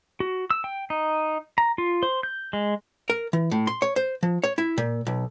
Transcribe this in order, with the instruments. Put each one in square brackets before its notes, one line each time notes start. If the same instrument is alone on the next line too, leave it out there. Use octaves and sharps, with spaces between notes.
[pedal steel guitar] F#4
E6
G5
D#4
A#5
F4
C5
G6
G#3
[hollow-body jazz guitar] A#4
E3
A2
C6
C#5
C5
F3
C#5
E4
A#2
B1